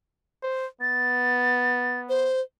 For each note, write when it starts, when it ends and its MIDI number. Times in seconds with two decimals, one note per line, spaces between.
0.43 0.67 72
0.81 2.31 59
0.81 2.00 93
2.09 2.41 72